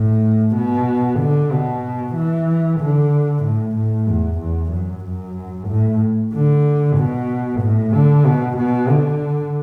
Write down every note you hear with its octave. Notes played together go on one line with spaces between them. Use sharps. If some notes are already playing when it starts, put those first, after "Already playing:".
Already playing: A2
B2
D3
B2
E3
D3
A2
A2
E2
E2
F#2
F#2
A2
D3
B2
A2
D3
B2
B2
D3